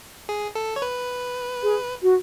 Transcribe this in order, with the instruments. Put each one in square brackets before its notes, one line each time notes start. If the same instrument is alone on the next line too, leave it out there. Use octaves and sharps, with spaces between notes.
[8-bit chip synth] G#4
A4
C#5
B4
[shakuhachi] G#4
F#4